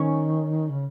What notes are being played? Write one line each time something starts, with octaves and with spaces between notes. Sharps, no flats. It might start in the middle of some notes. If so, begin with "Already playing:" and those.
Already playing: D#3 C#4
C#3